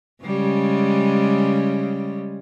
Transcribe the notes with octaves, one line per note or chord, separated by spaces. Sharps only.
C#3 G3 G#3